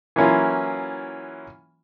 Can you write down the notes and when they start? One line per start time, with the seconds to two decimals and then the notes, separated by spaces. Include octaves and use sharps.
0.16 E3 F#3 A#3 C#4 E4 F4